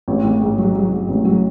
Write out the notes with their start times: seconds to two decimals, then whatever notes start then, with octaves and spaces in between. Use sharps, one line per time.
0.08 A1
0.24 A1
0.41 G#2
0.58 F#3
0.75 F#3
0.92 G#2
1.08 A1
1.25 F#3